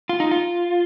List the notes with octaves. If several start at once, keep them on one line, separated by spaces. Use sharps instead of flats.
F4
D#4
F4